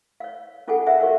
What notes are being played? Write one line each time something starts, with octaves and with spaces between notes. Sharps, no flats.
C#5 F5
C#4 F4 G#4 A4 F#5 G#5
C#4 A#4 E5 F#5 G#5
F#4 G4 A#4 C#5 F5